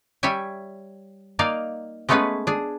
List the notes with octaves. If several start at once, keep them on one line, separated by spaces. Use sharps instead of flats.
G3 C#5 E5 G5 G#5
A#3 D#4 D5 F5
G#3 A3 B3 C#4 G#4 B4
D4 G#4